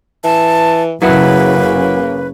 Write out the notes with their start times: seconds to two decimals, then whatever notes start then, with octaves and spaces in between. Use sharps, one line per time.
0.24 E3 A5
1.02 F#1 C#3 F#3 A#3 E4 F#4 B4